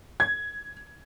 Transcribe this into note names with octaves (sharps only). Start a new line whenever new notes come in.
G#6